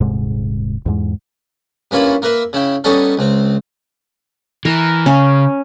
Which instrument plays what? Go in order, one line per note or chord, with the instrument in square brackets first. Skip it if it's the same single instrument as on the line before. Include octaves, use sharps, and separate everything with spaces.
[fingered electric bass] D#1 G#2 C3 G#3
E2 G#2 G#3
[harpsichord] G2 A#3 C#4 E4 F4 B5
A#3 A#4 B4 E5
C#3 E4 G5
G3 B3 C#4 D#4 A4
C#2 C4
[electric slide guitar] E3 [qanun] A#4
[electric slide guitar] C#3 [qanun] C#4